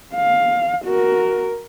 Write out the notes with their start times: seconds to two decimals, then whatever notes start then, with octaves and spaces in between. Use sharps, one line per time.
0.15 F5
0.85 F#4 A#4